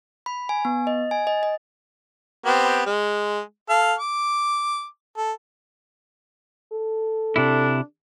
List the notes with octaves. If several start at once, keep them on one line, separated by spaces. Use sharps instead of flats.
B5
G#5
B3
D#5
G#5
D#5
D#5
B3 C4 G4
G#3
A4 F5 F6
D6
A4
A4
C3 D4 E4